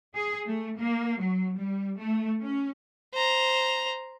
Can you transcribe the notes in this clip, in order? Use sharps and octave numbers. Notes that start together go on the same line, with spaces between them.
G#4
A3
A#3
F#3
G3
A3
C#4
C5 A#5